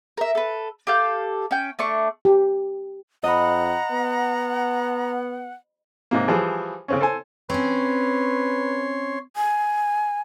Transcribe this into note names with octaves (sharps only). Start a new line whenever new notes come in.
A#4 E5
A4 B4
G4 A4 F5 G6
C#4 G5
A3 D4 C#6
G4
F2 D#5 F#5 A#5 B5
B3
G#2 C3 A#3
E3 F3 G3 G#4
C#3 C4 C#4
A4 C5 G#5
C4 C#4 B4 C#5 C6
G#5